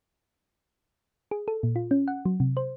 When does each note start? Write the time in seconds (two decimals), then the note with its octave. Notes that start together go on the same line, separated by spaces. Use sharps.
1.31 G#4
1.48 A4
1.63 A#2
1.76 F4
1.91 C#4
2.08 F#5
2.25 F#3
2.40 C3
2.57 C5